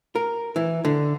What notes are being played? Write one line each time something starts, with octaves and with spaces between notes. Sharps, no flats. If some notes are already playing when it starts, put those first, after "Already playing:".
A#4
E3
D3